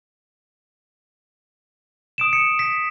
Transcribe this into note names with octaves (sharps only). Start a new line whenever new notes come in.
D#6 D7 E7
C#7
B6